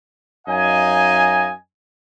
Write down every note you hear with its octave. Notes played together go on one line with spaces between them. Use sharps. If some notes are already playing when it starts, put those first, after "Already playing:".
F#2 D#4 D#5 F5 G#5